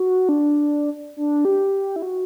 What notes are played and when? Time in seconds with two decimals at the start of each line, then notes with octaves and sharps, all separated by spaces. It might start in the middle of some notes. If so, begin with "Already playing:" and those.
Already playing: F#4
0.29 D4
1.17 D4
1.45 G4
1.96 E4
2.02 F#4